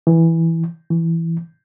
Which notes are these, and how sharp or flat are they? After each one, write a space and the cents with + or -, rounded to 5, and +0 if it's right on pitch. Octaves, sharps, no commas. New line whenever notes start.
E3 -5
E3 +5